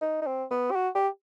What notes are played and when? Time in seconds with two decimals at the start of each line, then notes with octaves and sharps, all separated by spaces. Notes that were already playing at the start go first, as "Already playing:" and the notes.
0.02 D#4
0.22 D#4
0.27 C4
0.51 B3
0.71 G4
0.76 F#4
0.95 G4